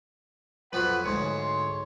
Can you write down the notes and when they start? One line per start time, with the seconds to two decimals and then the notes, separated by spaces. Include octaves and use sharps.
0.73 F2 F#3 B4 F#5
1.04 D2 G#2 C#5 C6